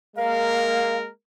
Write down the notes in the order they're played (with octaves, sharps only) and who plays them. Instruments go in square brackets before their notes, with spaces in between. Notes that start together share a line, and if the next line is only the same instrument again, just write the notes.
[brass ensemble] G#3 A#3 A#4 [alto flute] F5